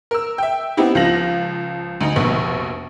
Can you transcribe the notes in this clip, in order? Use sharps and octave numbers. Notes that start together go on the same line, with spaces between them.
A#4 E6
E5 G5
B3 C4 D#4 E4 G4
C#2 F3 F4 A#6 F#7
D2 D#4
F1 A#1 B2